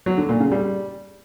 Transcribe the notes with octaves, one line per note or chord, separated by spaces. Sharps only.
F#3
D3
A#2
C#3
G3